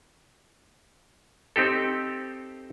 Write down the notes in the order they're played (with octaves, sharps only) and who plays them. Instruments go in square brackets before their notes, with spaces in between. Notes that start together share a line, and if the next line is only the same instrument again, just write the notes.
[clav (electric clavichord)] C4 D#4 G4 A4